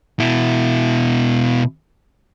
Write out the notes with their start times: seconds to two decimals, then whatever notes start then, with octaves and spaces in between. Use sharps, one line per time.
0.20 B2 E4